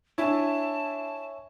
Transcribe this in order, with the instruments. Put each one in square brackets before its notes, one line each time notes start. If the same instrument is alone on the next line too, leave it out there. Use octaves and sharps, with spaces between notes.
[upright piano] D4 E4 [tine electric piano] C#5 E5 G#5 [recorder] A5